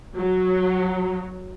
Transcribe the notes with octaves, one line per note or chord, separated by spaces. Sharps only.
F#3